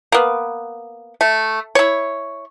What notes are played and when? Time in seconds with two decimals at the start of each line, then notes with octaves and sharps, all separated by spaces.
0.12 A#3 B3
1.21 A3
1.75 E4 C#5